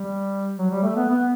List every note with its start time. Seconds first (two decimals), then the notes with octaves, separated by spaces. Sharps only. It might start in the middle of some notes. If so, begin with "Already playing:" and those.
Already playing: G3
0.58 F#3
0.71 G3
0.83 A3
0.96 B3
1.09 B3